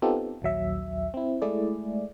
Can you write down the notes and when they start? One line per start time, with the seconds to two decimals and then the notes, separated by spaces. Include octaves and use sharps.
0.02 B3 C4 D#4 F4 G4 A4
0.42 A#1 D#2 F#3 E5
1.14 C4 E4
1.42 G#3 A3 E4 G#4 D5